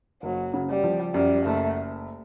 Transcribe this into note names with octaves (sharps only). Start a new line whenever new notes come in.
F#1 F#3
C#3
G3
F3
F#2 G3
F#1 A3